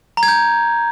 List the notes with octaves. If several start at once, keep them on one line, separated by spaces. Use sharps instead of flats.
A#5
G#6
G6